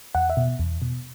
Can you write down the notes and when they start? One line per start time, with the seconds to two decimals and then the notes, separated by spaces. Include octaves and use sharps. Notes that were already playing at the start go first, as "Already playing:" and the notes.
0.15 E2 F#5
0.30 E5
0.37 B2
0.59 E2
0.82 B2